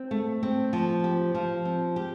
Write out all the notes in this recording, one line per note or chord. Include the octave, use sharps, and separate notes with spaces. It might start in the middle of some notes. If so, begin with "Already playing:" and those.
Already playing: C4
A3
C4
F3
G4
F3
C4
G4